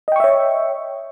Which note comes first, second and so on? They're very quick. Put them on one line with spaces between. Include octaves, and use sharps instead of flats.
D#5 G5 C#6 E5 C#5